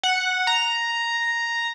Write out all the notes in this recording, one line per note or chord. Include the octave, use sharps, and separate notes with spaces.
F#5
A#5